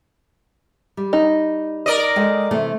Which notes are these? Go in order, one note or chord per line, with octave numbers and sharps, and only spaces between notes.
G3
D#4
A#4 D5 D#5
G#3 A4 G5
C3 E3 A3